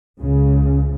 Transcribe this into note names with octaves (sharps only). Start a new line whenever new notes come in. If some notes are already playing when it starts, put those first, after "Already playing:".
C#2 C#3